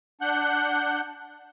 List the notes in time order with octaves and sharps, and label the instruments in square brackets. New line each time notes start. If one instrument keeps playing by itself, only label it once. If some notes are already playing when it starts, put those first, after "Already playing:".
[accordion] D4 F#5 F#6 G6